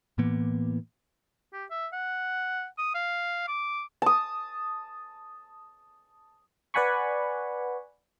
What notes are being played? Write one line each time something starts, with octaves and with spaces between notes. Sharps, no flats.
A2 E3 A#3 B3
G4
E5
F#5
D#6
F5
D6
A5 D#6
B4 D5 F#5 G#5 B5 C#6